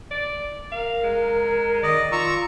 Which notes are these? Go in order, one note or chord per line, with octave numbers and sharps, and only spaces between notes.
D5
A#4 F5
G#3
D#3 D5 D#5
F4 A#5 C#6 E6